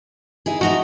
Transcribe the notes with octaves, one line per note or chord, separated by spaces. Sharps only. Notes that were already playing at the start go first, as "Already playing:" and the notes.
D#4 E4 G#4
F3 D#4 E4 F#4